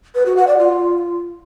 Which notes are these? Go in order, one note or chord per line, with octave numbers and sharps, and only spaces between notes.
B4
F#4
F#5
D5
F4